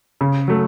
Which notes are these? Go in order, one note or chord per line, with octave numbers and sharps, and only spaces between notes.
C#3
F#3 A3